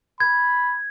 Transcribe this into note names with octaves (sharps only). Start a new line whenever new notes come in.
B5 G#6